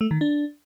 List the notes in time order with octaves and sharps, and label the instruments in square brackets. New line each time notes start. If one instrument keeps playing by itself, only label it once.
[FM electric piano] A3
D#3
D4